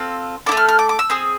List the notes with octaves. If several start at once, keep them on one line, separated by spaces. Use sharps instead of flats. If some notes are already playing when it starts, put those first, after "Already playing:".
Already playing: C4 F4 A4
E4 A4 D6
A3
F6
F6
D6
D6
E6
C4 G#4